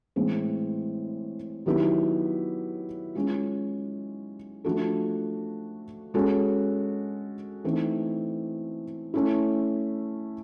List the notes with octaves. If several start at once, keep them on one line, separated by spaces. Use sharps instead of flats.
A2 E3 G#3 C4
D#3 F#3 B3 E4 G4
G#3 C#4 F4
F3 A3 D4 F#4 A4
G#3 C#4 F#4 A4
E3 A3 C4 D#4
A3 C#4 E4